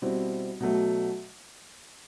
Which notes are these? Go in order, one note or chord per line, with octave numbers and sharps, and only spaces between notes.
B2 G3 C4 E4
B2 F#3 A3